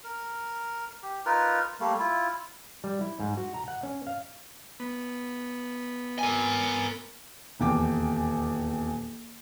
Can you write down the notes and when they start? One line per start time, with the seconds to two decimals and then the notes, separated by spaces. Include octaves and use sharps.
0.04 A#4
1.03 G4
1.26 D#4 F4 A#4 B4
1.80 G3 A3 A#3
2.00 E4 F4
2.84 G3
3.01 E4
3.20 G#2
3.37 F#4
3.54 A#5
3.68 F#5
3.83 C#4
4.07 F5
4.80 B3
6.19 A#4 G#5
7.60 D#1 E2 G5 D6